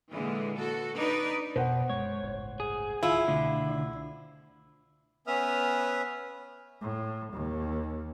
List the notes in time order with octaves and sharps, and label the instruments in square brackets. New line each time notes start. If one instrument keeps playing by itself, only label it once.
[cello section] A#2 D3 E3 G#3
F#4 A4
D4 D#4 B4 D5
[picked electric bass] F1 [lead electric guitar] B2 [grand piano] C5 F#5
[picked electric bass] F#2 G#3 [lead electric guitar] C#5
[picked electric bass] G1 C#2 A2
[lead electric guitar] G#4
[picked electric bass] D1 B1 D#3 [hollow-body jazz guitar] E4 F4
[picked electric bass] C2 B2 A3 [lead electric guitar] D3
[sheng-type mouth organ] B3 C#4 B4 E5 D#6 F6
[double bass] A2
D#2